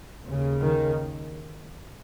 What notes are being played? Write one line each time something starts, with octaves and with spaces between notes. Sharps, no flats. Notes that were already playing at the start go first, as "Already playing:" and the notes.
D#2 C#3
D#3